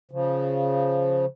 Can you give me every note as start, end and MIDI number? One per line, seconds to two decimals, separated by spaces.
0.11 1.26 49
0.11 1.26 53